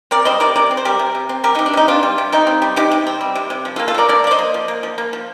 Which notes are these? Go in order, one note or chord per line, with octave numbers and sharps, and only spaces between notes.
C4 A#4 D5
G3 C5 D#5
C3 A#4 D5
C3 A#4 D5
C4
C5
G3 G4 A#4
C3
C3
C4
G3 G4 A#4
C3 D#4 G4
D4
C3 D#4
C4 D4 F4
G3
C3
C3 D#4
C4
G3
C3 D#4 G4
C3
C4
G3
C3
C3
F3
F4 A4
A#3
F4 A4
F3 A#4 D5
A#3 A#4 D5
F3 D5
C5 D#5
A#3
F3
A#3
F3
A#3
F3